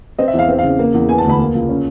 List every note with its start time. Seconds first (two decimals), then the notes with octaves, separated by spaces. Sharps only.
0.19 C4 D#5
0.28 E5
0.34 E2
0.39 F5
0.49 C4
0.59 F5
0.63 C#3
0.79 A#3
0.94 E2
1.09 B3 G#5
1.18 A5
1.24 D2
1.30 B5
1.39 A#3
1.55 C#2
1.69 C#4